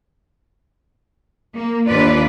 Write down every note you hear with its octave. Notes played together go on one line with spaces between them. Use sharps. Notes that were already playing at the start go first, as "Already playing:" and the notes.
A#3
D#2 D4 F4 B4 D5